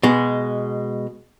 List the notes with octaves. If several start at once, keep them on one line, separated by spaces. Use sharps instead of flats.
B2 G#3